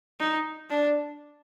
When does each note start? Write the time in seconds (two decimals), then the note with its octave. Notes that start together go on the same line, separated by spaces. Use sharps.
0.20 D#4
0.70 D4